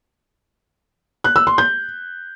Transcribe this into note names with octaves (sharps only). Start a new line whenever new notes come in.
F#6
E6
C6
G6